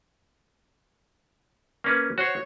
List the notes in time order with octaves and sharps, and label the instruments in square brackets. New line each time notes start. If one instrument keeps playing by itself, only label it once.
[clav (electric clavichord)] A#3 C#4 B4
[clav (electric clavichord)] F#4 C5 [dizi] C#5